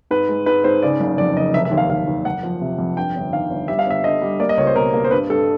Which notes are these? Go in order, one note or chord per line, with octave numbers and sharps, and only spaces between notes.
G#2 B4
G#3
G#2 B4
G#2 C5
C#3 D5
F#1
F2 D5
F#1 D#5
F1 E5
E5
D#2
F5
D#2 F5
D#2
F#1 F#5
F3
C3
F2
G2 G5
G1
D#3 F5
G1
G3 E5
F5
G1 E5
D3 D#5
G3
A#3 D5
D#5
C#2 C#5
C5
B2 A#4
A#3
C5
G2 B4
G2 A4